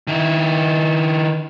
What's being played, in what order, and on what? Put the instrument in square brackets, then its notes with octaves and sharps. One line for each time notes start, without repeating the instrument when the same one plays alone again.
[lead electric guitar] D#3 E4